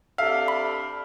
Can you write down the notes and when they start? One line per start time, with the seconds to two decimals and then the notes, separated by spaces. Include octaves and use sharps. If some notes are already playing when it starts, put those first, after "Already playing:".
0.18 C3 D4 A4 E5 F5
0.48 B5